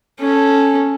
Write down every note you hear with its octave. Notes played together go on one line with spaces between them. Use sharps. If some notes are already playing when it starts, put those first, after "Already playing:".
C#4 A4